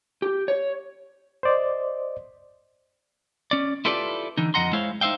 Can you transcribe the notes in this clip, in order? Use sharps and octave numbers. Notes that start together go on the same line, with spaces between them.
G4
C#5
C5 D5 D#5
C#4 D5
E4 F4 G4 A4 B4 D5
D3 E3 D#4
F2 D#5 F#5 A#5 C6
G#3 E4 C5 C#5 F5
D#4 C5 E5 F5 G5